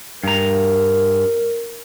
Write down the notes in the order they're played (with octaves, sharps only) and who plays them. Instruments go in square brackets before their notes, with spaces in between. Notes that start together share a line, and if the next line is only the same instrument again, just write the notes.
[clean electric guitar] G2 A#5 [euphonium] A#4